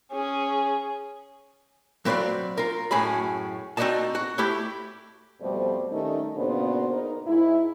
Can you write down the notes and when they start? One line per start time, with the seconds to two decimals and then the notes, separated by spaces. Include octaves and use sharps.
0.12 C#4 G#4
2.05 F#3 C4 B4 C#5 D5 F5
2.57 F4 A#4
2.91 F#2 A2 C#4 G#4 B5
3.77 C4 D#4 F#4 D5 D#5 A5
4.15 F#4
4.38 A3 E4 G4
5.41 F2 B2 G3 A3 C5 D5
5.91 D#3 G3 A3 C#4 D#4
6.37 A#2 C#3 B3 D4 F#4 C5
6.92 D#4 A#4
7.27 G#2 E4